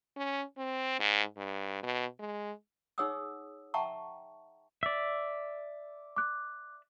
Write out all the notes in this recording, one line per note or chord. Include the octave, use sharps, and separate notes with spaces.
C#4
C4
G#2
G2
B2
G#3
D#4 G#4 C#5 F#5 D#6 E6
E5 F#5 G5 A5 A#5 C#6
D5 E5
D6 F#6